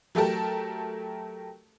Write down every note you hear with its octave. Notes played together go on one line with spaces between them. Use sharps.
F#3 A3 G4 A4 A#4 A5